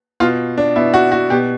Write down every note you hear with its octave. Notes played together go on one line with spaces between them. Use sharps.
B2 F4
D4
B2 E4
F#4
F#4
B2 G4